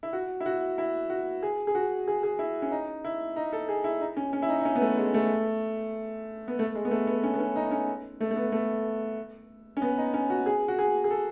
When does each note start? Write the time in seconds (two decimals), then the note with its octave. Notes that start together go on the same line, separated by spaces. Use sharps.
0.03 E4
0.13 F#4
0.40 E4
0.46 F#4
0.78 E4
1.10 F#4
1.43 G#4
1.67 G#4
1.75 F#4
2.08 G#4
2.23 G#4
2.39 E4
2.62 C#4
2.71 D#4
3.04 E4
3.36 D#4
3.53 A4
3.69 G#4
3.84 E4
4.01 D#4
4.17 C#4
4.33 C#4
4.42 E4
4.49 D#4
4.60 D#4
4.65 C#4
4.75 B3
4.81 A3
4.97 G#3
5.14 A3
6.48 B3
6.59 A3
6.75 G#3
6.85 B3
6.91 A3
7.07 B3
7.23 C#4
7.34 B3
7.40 C#4
7.56 D#4
7.71 C#4
8.21 A3
8.31 A3
8.36 B3
8.52 A3
9.77 C#4
9.82 B3
9.98 D#4
10.14 C#4
10.30 F#4
10.46 G#4
10.68 F#4
10.79 G#4
11.04 G#4
11.11 A4